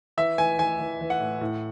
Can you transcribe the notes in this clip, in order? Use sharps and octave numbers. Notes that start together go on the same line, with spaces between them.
E3 E5
E3 G#5
E3 G#5
E3
E3
F#5
A2
A2